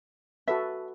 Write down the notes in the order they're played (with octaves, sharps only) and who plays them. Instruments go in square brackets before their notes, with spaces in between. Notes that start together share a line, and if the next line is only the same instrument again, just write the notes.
[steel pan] F#4 A4 B4 [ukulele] E5